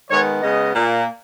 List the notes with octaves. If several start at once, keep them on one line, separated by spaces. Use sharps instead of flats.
D#3 G#3 B3 C#5
C#3 G#3 B3 D#5
A#2 A#3